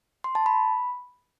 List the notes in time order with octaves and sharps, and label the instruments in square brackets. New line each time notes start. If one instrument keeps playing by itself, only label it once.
[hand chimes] C6
A5
B5